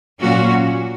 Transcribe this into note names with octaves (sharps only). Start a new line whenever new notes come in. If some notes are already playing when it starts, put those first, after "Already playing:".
A#2 F#3 A#3 C#4 F#4